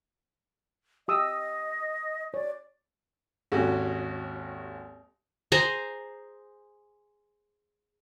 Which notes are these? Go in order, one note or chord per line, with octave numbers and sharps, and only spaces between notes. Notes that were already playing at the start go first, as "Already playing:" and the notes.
G4 D#5 D#6 E6
C#5 D5
G#1 D#2 C#4 F#4 G4 A4
G#4 C5 G#5 A#5